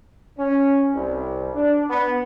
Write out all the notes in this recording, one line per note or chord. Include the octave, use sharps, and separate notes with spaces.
C#4
C2
D4
B3